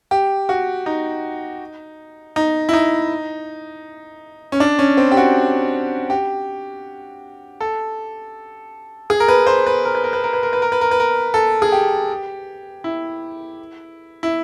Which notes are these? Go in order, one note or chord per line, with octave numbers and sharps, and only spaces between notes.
G4
F#4
D#4
D#4
E4
D#4
C#4
D4
C#4
C4
G4
F#4
G4
A4
G#4
A#4
B4
C5
B4
A#4
B4
A#4
B4
A#4
B4
A#4
B4
A#4
B4
A#4
B4
A#4
A4
G#4
G4
E4
E4